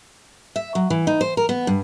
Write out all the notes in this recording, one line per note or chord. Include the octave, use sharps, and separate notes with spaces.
E5
F#3
E3
D#4
C5
A#4
B3
G2